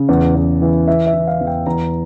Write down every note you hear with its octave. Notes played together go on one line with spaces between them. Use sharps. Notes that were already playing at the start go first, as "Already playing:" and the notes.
Already playing: C#3
E2
E2
E3
E3 E5
E5
E3
F5
E2
G5
E2 A#5